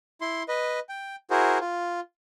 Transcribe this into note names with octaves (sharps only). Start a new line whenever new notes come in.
E4 C6
B4 D#5
G5
E4 F#4 G#4 A#4 C5
F4